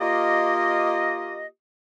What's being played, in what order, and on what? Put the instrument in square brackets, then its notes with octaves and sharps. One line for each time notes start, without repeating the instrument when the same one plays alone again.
[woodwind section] A#3 F4 G4 D#5